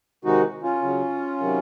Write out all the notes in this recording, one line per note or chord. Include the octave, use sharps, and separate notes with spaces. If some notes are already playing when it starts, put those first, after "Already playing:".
C3 D#3 G#3 D#4 F#4
C#4 F4
C#3 F#3
C3 D#3 F#3